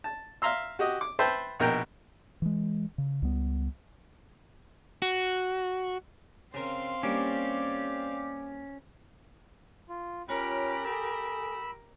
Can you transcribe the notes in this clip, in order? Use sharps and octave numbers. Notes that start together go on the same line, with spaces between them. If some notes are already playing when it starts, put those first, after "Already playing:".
A5
E5 F5 A#5 C6 E6
F#4 G4 D#5
D6
B4 C5 E5 G5 A5
A#1 B2 A#4 G5 A#5
E3 G#3
C#3
C#2 G3 B3
F#4
C#3 C4 A#4 F5 C6
G3 A#3 C#4 D4 G4 D5 D6
F4
C#4 F4 G4 A#4 C#5 A#5 B5 F#6
A4 G#5 B5 D#6 E6